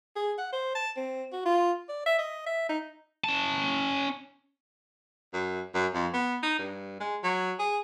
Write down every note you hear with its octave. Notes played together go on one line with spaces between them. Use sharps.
G#4
F#5
C5
A5
C4
F#4
F4
D5
E5
D#5
E5
D#4
C#4 A5
F#2
F#2
F2
B3
D#4
G2
G#3
F#3
G#4